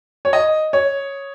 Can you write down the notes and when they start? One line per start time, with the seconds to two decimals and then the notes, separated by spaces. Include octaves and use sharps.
0.25 C#5
0.33 D#5
0.73 C#5